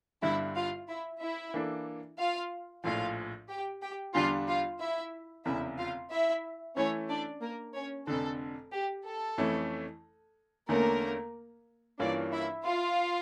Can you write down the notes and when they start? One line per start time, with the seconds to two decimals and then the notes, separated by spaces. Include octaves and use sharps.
0.22 G1 G2 D3 G3 E4 E5
0.55 F4 F5
0.88 E4 E5
1.21 E4 E5
1.54 E3 A#3 D4 A4
2.18 F4 F5
2.84 A#1 A2 F3 F4 F5
3.49 G4 G5
3.82 G4 G5
4.14 E2 D3 G3 D4 F4 F5
4.47 F4 F5
4.80 E4 E5
5.45 F1 E2 C#3 E4 E5
5.78 F4 F5
6.11 E4 E5
6.76 E3 A3 C#4 E4 C#5
7.09 D4 D5
7.41 A#3 A#4
7.74 C#4 C#5
8.07 F1 F2 D3 A4
8.72 G4
9.05 A4
9.38 F2 E3 A3 C#4 E4
10.68 E2 D3 A3 A#3 C#4 A#4
11.99 G2 E3 A#3 C#4 D4 F4 D5
12.32 E4 E5
12.65 F4 F5